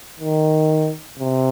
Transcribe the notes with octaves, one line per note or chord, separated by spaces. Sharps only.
D#3
C3